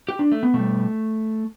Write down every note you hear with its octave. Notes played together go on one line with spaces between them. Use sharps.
G4
D4
A3
B3
B2 G3 A3